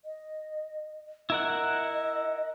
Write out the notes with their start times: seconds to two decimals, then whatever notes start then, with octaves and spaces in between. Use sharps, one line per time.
0.05 D#5
1.30 E4 A#4 D#5 F#5